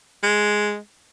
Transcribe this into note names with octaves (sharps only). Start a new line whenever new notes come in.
G#3